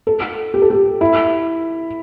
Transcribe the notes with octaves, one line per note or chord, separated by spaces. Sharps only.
A4
G4
A4
G4
E4